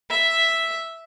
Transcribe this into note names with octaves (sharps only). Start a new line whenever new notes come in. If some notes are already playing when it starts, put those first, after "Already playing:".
E5